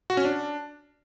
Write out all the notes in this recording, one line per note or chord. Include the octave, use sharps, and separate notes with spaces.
F#4
C#4
D4